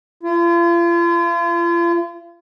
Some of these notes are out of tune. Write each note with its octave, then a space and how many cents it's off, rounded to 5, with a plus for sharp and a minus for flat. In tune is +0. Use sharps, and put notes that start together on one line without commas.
F4 -40